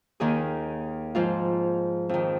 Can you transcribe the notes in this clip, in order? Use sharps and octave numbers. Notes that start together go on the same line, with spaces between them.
D#2 D#3 G#4
G#2 F3 F4
F2 D#3